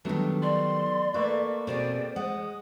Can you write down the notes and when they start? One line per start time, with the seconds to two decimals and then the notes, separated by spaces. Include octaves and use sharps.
0.05 D#3 F#3 G3 A3 B3 D4
0.42 D5 C6
1.14 A3 A#3 A4 B4 C#6
1.67 B2 C4 G#4 C5 D5
2.16 G#3 F#5 D#6